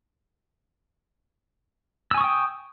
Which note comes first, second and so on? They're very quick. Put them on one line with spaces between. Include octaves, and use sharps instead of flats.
E6 G#5 C#6 D#6 G5